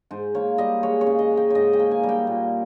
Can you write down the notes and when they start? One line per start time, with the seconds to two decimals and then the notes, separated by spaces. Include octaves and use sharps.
0.11 G#2 C5
0.35 A#3 C#5
0.58 G3 D#5
0.83 G#3 C#5
1.01 C#5
1.07 C#3
1.19 D#5
1.31 G#3
1.37 G5
1.50 G#2 C#5 D#5
1.73 G5
1.79 A#3
1.91 G#5
2.03 G3
2.09 G5
2.27 A#2